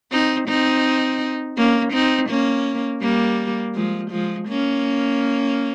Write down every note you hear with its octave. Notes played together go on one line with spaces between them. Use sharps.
C4 D#4
C4 D#4
A#3 C#4
C4 D#4
A#3 C#4
G3 A#3
F3 G#3
F3 G#3
A#3 C#4